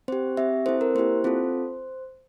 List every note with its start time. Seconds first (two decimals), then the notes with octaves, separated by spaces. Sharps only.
0.08 C4 G4 C5
0.37 C4 G4 E5
0.66 C4 E4 A4 C5
0.81 A#4
0.95 A#3 E4 G4 C5
1.24 C4 F4 A4